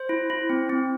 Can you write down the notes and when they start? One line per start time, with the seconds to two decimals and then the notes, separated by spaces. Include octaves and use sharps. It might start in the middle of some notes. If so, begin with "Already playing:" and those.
Already playing: C5
0.09 E4
0.30 E4
0.50 C4
0.70 C4